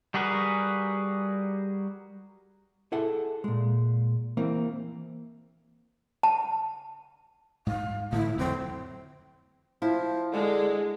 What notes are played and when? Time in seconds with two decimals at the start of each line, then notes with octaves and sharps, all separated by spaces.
0.14 G3 F#4 G#4 A#4 B4
2.92 E4 G#4 A4 E5 F#5
3.44 A#2 G#3
4.37 E3 A#3 C4
6.23 A5
7.67 G#2 F5
8.12 A2 D3 E3 E4
8.38 F2 D3 F#3 C4
9.82 F3 E4
10.33 D3 G#3